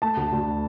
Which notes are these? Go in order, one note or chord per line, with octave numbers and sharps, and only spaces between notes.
A3 A5
D2
D2